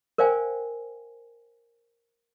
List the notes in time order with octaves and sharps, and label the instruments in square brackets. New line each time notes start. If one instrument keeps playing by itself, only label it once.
[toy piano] A#4 C5 D5 F5 G5 G#5